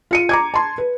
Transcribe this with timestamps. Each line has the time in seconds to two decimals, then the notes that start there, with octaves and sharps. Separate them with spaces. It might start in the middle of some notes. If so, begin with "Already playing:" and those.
0.11 F4 C#7 D#7
0.29 A#5 D6 G#6
0.54 A5 C6
0.78 B4